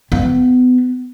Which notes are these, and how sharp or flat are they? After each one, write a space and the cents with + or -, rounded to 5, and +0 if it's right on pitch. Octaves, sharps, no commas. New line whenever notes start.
B3 +30